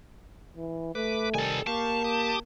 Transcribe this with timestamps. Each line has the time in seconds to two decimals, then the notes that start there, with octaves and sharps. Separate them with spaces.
0.56 E3
0.95 A3 B4 D6
1.34 C3 D#3 G3 A4 G#5
1.67 A#3 G4 F5 A5 C#6
2.04 G4 D6 D#6